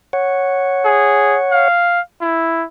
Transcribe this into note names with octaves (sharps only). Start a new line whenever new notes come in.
C#5 F#5
G#4
F5
E4